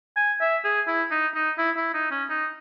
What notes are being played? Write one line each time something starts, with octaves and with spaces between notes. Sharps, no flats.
G#5
E5
G#4
E4
D#4
D#4
E4
E4
D#4
C#4
D#4